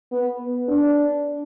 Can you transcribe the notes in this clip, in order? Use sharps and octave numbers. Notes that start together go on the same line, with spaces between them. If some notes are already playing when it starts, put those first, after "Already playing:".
B3
D4